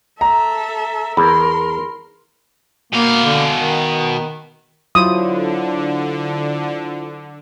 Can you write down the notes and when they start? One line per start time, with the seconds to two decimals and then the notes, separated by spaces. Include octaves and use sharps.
0.21 A4 E5 A#5
1.17 E2 A#4 B5 C6
2.93 B2 A#3 F5
3.25 D3
3.54 D#3
4.95 D3 F#3 E4 F4 C5 D#6